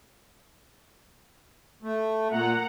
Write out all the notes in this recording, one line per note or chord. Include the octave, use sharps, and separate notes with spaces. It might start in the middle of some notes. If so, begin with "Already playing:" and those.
A3
A#2 A#3 F#5 A#5